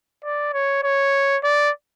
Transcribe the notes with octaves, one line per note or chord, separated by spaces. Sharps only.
D5
C#5
C#5
D5